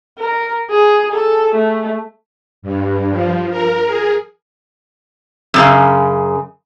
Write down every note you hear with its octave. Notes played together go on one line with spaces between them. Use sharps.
A#4
G#4
A4
A3
G2
F3
A#4
G#4
F#2 C#3